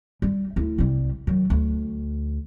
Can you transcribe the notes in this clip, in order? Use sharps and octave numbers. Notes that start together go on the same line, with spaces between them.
G3
D2 E4
C2 G3
D#3 F#3
D2